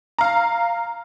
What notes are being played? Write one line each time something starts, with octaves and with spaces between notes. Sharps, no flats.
F5 A#5